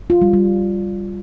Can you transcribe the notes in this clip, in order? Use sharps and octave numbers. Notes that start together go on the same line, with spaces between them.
F4
G3
G3